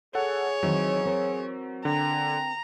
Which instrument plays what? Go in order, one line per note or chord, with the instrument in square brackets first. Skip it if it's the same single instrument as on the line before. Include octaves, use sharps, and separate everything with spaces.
[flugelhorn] G#4 [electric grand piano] A4 F#5 [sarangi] C#5
[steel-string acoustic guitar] D#3 E3 C4 [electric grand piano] F#3
[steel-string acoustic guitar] C4 A#4
[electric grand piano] D3 [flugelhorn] G5 [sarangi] A#5